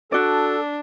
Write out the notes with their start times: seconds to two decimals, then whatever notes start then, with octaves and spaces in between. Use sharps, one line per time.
0.12 D4 F#4 A4 D5